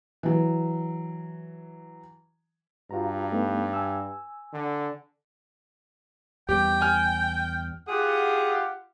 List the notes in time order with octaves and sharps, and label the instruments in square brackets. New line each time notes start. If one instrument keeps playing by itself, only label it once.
[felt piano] E3 F#3
[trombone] G2 [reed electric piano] F4 F#4 A#5
[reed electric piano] A3 B3 D#4
G#5 E6
[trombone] D3
[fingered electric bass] E2 G3 [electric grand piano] G4 [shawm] G5
[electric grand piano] G#5 F6
[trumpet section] F4 G4 F#5 [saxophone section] G#4